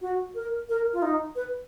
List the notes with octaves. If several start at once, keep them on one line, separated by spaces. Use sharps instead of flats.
F#4
A#4
A#4
F4
D#4
B4